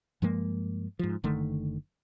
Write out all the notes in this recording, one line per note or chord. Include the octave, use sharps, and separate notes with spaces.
G2 F3 G#3 A#3
G#2 F3
F#1 D3 D#3 A3